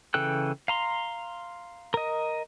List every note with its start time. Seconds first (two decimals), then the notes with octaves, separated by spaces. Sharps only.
0.14 C#3 E3 A4 G5 F#6
0.68 F5 A#5 C6
1.94 A#4 D#5